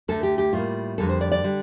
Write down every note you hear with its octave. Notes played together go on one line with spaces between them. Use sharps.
D2 D3 A3 A4
G4
G4
A2 G3 A#3 F4
F2 D3 G3 A#3 A4
C5
D5
D5
D3 G3